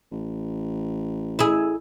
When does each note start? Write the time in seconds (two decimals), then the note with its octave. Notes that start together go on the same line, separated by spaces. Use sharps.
0.12 A1
1.39 E4 G#4